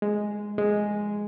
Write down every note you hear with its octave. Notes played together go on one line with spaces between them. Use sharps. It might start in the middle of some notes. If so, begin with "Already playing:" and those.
G#3
G#3